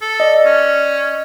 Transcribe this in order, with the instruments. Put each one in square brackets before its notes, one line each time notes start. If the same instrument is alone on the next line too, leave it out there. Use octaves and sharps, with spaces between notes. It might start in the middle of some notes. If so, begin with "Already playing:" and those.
[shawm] A4
[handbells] D5 D#5
[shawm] C#4